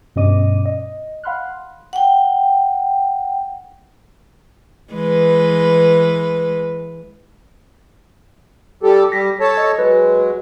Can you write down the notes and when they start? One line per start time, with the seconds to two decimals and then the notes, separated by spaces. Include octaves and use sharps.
0.16 G2 B2 C#4 D#5 D6 D#7
0.65 D#5
1.24 F5 F#5 B5 C6 F6 F#6
1.93 F#5 G5
4.93 E3 G#3 B4
8.83 G3 G4 A4
9.12 G3 G4 A#6 B6
9.40 A4 C#5 A5
9.57 D#5
9.79 F#3 G#3 B4